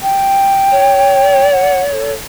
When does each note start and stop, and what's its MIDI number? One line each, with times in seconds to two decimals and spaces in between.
0.02 1.48 79
0.71 2.13 73
1.52 1.81 78
1.92 2.14 69